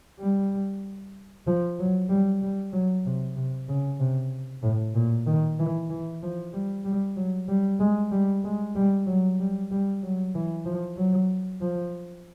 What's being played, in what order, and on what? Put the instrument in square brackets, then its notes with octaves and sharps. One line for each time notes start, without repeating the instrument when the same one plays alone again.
[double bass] G3
F3
F#3
G3
G3
F#3
C3
C3
C#3
C3
A2
A#2
D#3
E3
E3
F3
G3
G3
F#3
G3
G#3
G3
G#3
G3
F#3
G3
G3
F#3
E3
F3
F#3
F3